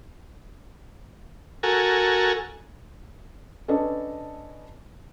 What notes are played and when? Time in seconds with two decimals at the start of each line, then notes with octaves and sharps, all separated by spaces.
1.63 F#4 A4 A#4 G#5
3.68 C#4 D4 A4 B4 D#5 A5